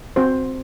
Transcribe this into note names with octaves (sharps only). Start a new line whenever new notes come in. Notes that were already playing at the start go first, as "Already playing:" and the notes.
C4 F#4 C5